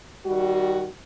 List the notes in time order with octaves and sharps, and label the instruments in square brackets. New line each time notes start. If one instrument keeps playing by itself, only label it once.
[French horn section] D#3 G3 F#4